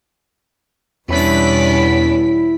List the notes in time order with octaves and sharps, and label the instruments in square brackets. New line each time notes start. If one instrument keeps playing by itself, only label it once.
[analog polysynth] E2 B5 B6 [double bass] B2 G3 [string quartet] C#4 D4 [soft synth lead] E4